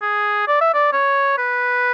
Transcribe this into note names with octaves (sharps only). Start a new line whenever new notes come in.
G#4
D5
E5
D5
C#5
B4